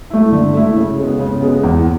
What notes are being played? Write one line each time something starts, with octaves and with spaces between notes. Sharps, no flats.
A3 E4
D3
A3 E4
C#3
G#3 B3
C#3
G#3 B3
E2